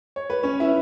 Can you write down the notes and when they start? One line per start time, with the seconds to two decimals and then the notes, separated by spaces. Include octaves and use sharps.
0.16 C#5
0.30 B4
0.43 C#4 C#5
0.60 E4 E5